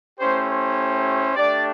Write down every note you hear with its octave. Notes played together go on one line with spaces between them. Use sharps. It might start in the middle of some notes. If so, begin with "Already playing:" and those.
A3 C#4 E4 G4 C5
C5
A3 D4 G4 D5